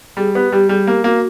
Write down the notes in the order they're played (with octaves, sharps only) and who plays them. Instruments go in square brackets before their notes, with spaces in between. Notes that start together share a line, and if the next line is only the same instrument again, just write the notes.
[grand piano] G3 [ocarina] G#4
[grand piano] B3 [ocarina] G4
[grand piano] G3 [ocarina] G4
[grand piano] G3 [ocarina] G#4
[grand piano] A#3 [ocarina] G4
[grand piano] A#3 [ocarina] F#4